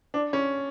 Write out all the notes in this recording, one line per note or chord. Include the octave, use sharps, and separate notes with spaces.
D4
C#4